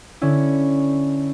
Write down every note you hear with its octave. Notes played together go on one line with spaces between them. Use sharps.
D3 C#4 E4